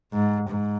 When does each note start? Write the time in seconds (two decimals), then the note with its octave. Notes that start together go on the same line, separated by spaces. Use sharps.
0.13 G#2
0.49 G#2